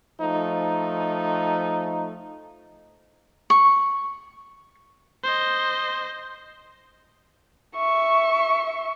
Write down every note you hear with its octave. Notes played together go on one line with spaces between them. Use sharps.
F3 A3 D#4
C#6
C5 D#5
E5 C#6